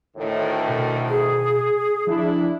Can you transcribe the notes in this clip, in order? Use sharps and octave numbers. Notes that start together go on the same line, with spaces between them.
D2 A2 D#3
B2
G#4
F3 D4 E4